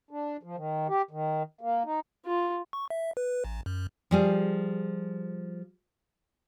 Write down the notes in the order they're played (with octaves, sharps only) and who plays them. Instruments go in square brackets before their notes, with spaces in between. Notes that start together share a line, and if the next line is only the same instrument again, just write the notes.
[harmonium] D4
F3
D#3
G4
D#3
A#3
D#4
[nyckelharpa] F4
[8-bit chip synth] C#6
E5
B4
A1
F#2
[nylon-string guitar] F3 G3 G#4